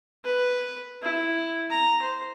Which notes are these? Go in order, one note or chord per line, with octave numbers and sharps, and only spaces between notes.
B4
E4
A#5
C5